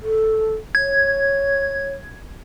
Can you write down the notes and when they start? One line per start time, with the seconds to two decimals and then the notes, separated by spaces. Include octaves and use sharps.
0.02 A4
0.75 C#5 G#6